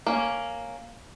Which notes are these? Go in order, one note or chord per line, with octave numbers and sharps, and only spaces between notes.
A#3 C#4